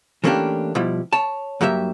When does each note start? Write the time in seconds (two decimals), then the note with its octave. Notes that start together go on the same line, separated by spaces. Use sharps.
0.24 E3 A3 A#3 C#4 D4 G4
0.75 B2 F3 G3 E4
1.13 C#5 A5
1.61 G2 F#3 A#3 G4 E5